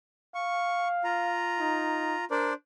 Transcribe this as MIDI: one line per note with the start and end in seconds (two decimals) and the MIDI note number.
0.35 1.34 77
0.35 0.88 85
1.04 2.25 65
1.04 2.25 82
1.59 2.15 63
2.31 2.54 62
2.31 2.51 70
2.31 2.54 72
2.31 2.54 74